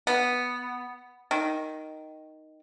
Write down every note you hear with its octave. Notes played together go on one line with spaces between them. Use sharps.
B3
D#3